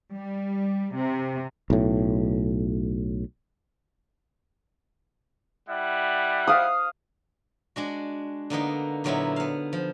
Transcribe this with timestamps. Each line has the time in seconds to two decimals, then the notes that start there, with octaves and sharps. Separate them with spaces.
0.14 G3
0.96 C3
1.70 B1 A2
5.68 G3 E4 F#5
6.47 F5 D#6
7.76 G#3 D4 F#4
8.50 D3 A#3 B3 D#4
9.04 A#2 D3 F#3 B3 D#4 E4
9.36 B3 F5
9.73 F3